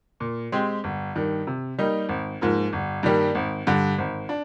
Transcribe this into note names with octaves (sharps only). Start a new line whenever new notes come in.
A#2
G#3 C4 G4
G1
G2 D#3
C3
G3 A#3 D#4
G#1
G#2 F3 A#3
G1
G2 D#3 G3 A#3
G#1
G2 D3
G#1
D4